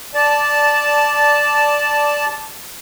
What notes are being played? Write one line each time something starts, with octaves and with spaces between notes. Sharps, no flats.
D5 A5